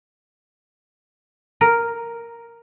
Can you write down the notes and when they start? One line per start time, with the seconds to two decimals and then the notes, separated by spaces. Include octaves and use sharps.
1.61 A#4